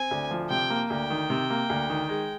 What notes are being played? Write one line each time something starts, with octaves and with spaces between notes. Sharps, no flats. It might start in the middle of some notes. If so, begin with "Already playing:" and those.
Already playing: C4 G#5
D2
F3
C3 G5
A#3
D2 G5
D#3
C3
A#3
D2
D#3
G#3